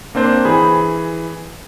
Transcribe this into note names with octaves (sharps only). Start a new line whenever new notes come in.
A#3 C4 D4 C5
E3 G#4 B5